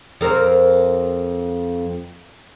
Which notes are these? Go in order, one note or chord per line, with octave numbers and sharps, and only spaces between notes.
F2 A#4 C5